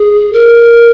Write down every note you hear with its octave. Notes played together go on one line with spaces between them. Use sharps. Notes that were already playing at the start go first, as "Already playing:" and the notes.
Already playing: G#4
A#4